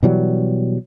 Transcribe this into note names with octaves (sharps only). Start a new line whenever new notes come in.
B2 E3 F#3 G3